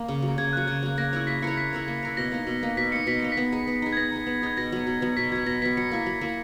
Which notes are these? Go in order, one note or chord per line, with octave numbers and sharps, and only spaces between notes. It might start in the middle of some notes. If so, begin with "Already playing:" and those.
Already playing: A#3
C#3
F#3
A#3
C#3 G#6
F#3 A#3 F#6
C#3 G#6
F#3 A#3
A#3 A#6
E4 A#4 C#5
A#3 B6
E4 A#4 C#5 C#7
A#3 B6
E4 A#4 C#5
A#3
E4 A#4 C#5
B2 A#6
A#3 D#4
B2
A#3 D#4
B2 B6
A#3 D#4 C#7
B2 B6
A#3 D#4 C#7
B6
B3
D#4 G#4
B3
D#4 G#4
G#6
B3 A#6
D#4 G#4
B3
D#4 G#4 G#6
B2 A#6
F#3 B3
B2
F#3 B3
B2 B6
F#3 B3 G#6
B2 A#6
F#3 B3 B6
F#3 C#7
A#3 E4
F#3
A#3 E4